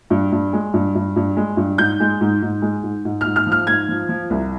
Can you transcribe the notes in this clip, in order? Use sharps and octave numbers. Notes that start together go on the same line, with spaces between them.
G2
G2
G#3
G2
G2
G2
G#3
G2
G#2 G6
G#3
G#2
G#2
G#3
G#2
G#2
F6
G#2
F6
F3
F6
G#2 G#6
F3
F3
C2